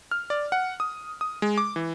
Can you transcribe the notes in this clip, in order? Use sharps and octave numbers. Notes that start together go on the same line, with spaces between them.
F6
D5
F#5
D#6
D#6
G#3
D6
E3